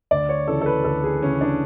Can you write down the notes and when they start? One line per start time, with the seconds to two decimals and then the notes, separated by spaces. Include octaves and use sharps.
0.11 D2 D5
0.29 C#5
0.48 C#3 E3 A4
0.61 A4
0.66 B4
0.84 D2 A4
1.04 G#4
1.22 C#3 E3 C#4
1.41 D4